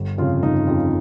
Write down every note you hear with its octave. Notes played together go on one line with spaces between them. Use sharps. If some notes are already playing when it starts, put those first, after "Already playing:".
Already playing: G1
F2 C#3 F4
G1 D#4
F2 C#3 F4